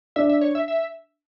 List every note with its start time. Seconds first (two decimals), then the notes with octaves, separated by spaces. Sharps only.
0.16 D4 E5
0.29 E5
0.41 C#5
0.55 E5
0.68 E5